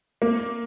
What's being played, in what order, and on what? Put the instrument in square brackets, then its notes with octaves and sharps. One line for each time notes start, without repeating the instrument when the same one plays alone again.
[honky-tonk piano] A#3